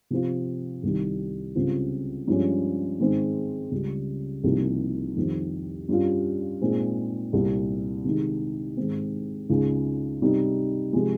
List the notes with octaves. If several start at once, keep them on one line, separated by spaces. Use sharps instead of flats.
C3 F3 C4 F4
C2 C3 D#3 G3
C#2 C#3 G3 C4 F4
G2 F3 G#3 C#4
G#2 D#3 G#3 C4
C#2 C#3 G3
C2 C3 F3 A#3 D#4
F2 D#3 G3 C4
G2 G3 C#4 F4
A#2 G#3 C4 D#4
C2 A#2 G3 C4
C3 D#3 G#3 D#4
G#2 D#3 G#3 C4
C#2 C#3 G#3 D#4
C3 G3 C4 D#4
C3 F3 G#3